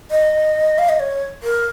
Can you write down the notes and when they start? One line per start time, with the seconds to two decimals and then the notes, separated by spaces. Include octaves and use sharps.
0.11 D#5
0.78 F5
0.89 D#5
1.00 C#5
1.43 A#4